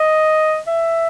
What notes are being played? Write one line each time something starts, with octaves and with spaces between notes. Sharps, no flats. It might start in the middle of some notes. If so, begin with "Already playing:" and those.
Already playing: D#5
E5